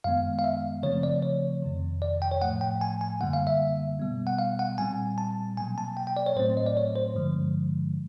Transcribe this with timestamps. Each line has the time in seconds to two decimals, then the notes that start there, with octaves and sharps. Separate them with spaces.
0.04 F#2 D#3 G#3 B3 F5
0.39 F5
0.44 E5
0.83 C#3 F3 A3 C4 C#5
1.03 D5
1.23 C#5
1.62 F2 C3 D#3
2.02 D5
2.22 G5
2.31 C#5
2.42 A2 F3 A3 F#5
2.61 G5
2.81 G#5
3.01 G#5
3.21 F#2 D3 G3 A#3 F#5
3.33 F5
3.47 E5
3.99 B2 G3 B3
4.27 F#5
4.39 F5
4.59 F#5
4.78 A#2 G3 C4 G#5
5.18 A5
5.57 B2 F#3 A#3 G#5
5.78 A5
5.97 G5
6.07 G5
6.17 D5
6.26 C#5
6.36 A2 F#3 A3 C4 C5
6.57 D#5
6.66 D5
6.77 C#5
6.96 C5
7.15 G2 D3 F3 G#3